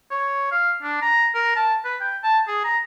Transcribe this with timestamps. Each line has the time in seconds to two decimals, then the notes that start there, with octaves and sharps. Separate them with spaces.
0.11 C#5
0.51 F5
0.83 D4
1.02 A#5
1.34 A#4
1.56 A5
1.84 B4
2.01 G5
2.23 A5
2.48 G#4
2.64 A#5